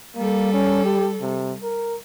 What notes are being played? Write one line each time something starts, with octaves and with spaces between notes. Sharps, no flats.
G3 A#3 A4
C#4
G4
C3
A#4